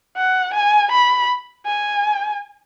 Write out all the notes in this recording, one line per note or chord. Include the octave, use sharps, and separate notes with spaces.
F#5
G#5
B5
G#5